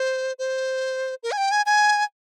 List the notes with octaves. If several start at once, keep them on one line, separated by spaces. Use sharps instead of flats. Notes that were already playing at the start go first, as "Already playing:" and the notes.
Already playing: C5
C5
A#4
G#5
G5
G#5
G#5